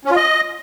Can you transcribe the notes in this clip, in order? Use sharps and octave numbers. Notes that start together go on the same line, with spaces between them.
C#4
F4
D#5